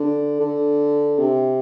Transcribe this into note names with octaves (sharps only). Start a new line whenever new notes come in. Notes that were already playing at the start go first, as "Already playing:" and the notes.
Already playing: D3
D3
C3